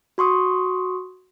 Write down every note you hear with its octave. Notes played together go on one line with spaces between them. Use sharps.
F#4 C6 C#6 D#6